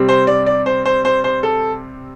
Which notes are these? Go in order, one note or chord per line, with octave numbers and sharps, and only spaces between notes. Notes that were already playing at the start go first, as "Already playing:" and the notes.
Already playing: C3 G3 C4
C5
D5
D5
C5
C5
C5
C5
A4